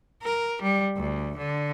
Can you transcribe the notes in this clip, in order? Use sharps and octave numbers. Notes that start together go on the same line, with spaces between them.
A#4
G3
D2
D3